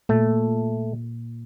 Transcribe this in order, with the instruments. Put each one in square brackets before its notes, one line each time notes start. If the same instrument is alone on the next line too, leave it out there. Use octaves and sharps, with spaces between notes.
[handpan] A#2 [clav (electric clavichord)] A3